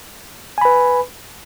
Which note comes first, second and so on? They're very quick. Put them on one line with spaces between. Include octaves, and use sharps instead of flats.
G#5 B5 B4